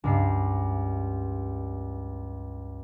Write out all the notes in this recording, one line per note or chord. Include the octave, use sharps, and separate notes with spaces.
C#2 G2 C7